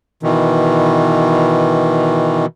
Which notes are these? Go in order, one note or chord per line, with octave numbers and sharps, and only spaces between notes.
B2 D#3 E3